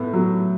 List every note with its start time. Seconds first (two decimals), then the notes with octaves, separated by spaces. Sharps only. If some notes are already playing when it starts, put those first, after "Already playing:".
Already playing: A2 B3
0.13 F#3